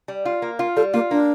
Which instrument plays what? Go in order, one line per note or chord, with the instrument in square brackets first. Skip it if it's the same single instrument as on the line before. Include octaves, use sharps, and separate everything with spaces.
[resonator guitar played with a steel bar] G3
F4
A#3
F4
[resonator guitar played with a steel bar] G3 [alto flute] A4
[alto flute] A#3 [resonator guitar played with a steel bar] F4
[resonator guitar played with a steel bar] A#3 [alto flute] D4